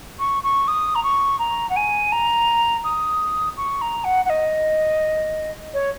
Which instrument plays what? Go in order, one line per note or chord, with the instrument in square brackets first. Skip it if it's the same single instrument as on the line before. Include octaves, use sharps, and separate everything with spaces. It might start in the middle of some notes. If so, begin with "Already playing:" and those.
[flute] C#6
C#6
D#6
A#5
C#6
A#5
F#5
G#5
A#5
D#6
C#6
A#5
F#5
F#5
D#5
C#5